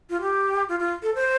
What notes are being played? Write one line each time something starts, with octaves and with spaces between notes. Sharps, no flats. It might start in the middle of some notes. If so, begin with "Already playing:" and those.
F4
G4
F4
F4
A4
C5